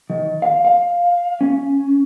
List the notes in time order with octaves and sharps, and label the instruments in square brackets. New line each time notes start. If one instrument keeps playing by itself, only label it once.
[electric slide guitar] D#3
F5
F5
C#4